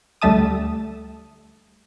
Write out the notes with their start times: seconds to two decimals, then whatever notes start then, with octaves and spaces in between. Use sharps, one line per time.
0.22 D2 G3 A3 E5 A5 D#6